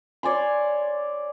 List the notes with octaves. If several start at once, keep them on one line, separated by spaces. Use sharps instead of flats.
C#5 D5 G#5 C6